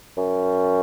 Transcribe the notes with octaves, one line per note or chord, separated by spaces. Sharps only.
F#2